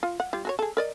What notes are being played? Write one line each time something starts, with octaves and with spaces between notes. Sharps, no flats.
F4
F#5
G3 F4
F#4 A4 C#5
G#4 A4
A#4 D5 D#5